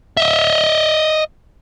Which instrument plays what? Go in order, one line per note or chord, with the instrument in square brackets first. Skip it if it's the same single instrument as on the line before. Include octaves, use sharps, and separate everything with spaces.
[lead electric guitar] D#5 E5